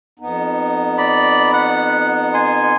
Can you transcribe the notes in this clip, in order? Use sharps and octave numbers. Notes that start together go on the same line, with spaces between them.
F2 B3 D#4
D5 B5
F#5
G#5 C6